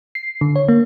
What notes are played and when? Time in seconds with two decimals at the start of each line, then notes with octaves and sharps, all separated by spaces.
0.15 C7
0.41 D3
0.56 C#5
0.68 A#3